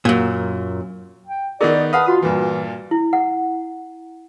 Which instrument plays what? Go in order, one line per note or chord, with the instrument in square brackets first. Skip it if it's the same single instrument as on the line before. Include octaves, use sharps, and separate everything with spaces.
[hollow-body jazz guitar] F#2 A#2
[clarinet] G5
[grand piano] D#3 B3 D#4 [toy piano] G#4 A#4 [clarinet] D5
[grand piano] B4 F6 [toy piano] F5 F#5 A5 [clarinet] D#6
[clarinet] F4 [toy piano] F#4
[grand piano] G2 A#2 [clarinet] E3
[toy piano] E4
F#5